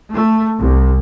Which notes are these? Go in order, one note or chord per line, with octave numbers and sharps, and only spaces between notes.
A3
C2